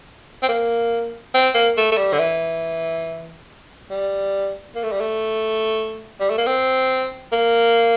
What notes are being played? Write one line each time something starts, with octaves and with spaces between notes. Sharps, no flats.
C4
A#3
C4
A#3
A3
A3
G3
D3
E3
G3
A#3
A3
G3
A3
G3
A3
A#3
C4
A#3